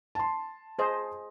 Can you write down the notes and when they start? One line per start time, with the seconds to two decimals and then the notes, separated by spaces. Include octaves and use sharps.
0.15 A5 C6
0.79 G#4 C5 D#5